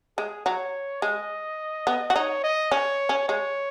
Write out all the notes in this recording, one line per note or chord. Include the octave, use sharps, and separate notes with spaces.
G#3 G#4
F#3 C#5
G#3 D#5
B3
F#4
D#4 C#5
D#5
C#4 C#5
C#4
G#3 C#5